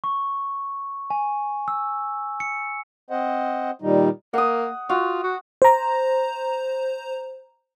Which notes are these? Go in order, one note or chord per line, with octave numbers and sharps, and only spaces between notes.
C#6
G#5
E6
C#7
C4 C5 D#5 F#5
A#2 D#3 G3 D#4
A#3 F#5 D#6
F4 F#4
F#4
C5 A#5